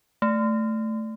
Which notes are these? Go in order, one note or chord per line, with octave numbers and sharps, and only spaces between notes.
A3